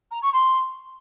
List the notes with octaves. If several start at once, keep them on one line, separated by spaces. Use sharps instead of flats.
A#5
C#6
C6